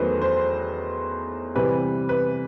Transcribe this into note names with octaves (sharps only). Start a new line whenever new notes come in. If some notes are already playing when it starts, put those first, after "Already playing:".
Already playing: E2 D#3 F#3 A3 B4 C5
C5
C3 E3 G3 B4
B4